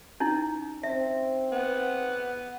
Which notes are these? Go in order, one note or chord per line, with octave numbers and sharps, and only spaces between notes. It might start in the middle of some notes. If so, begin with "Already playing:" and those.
C#4 D#4 E4
C4 E5
B3 F#5